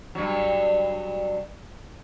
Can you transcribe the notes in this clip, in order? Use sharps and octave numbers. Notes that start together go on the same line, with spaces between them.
G2 F#3